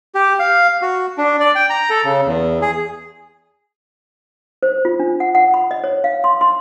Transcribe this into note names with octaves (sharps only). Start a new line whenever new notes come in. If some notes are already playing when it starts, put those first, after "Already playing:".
G4
F5
F#4
D4
D5
G5
A#5
A4
C#3
E2
G#4
C5
F4
D4
F#5
F#5
B5
D#5
C#5
F5
C6
C6